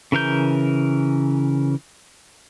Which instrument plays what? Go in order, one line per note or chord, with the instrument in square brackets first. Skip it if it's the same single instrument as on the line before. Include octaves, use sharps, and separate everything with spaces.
[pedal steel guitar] C#3 E3 A#4 G6